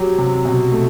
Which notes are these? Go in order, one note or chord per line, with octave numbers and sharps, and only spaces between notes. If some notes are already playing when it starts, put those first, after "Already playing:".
Already playing: F#3 G4
C3
B2
A3